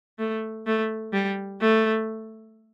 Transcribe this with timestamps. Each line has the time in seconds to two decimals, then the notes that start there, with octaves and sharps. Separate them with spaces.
0.19 A3
0.67 A3
1.13 G3
1.61 A3